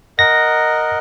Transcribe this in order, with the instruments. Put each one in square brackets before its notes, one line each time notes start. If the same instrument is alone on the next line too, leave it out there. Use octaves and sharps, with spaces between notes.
[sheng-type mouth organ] A#4 D#5 F#5 [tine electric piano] A#6